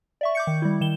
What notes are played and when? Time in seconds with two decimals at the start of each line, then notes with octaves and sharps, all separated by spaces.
0.21 D5 E5 C#6
0.35 D6 G6 C#7
0.47 D#3
0.62 G3 E4
0.81 D#3 E7 G7